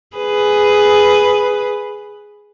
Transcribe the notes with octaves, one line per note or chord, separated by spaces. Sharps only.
G#4 B4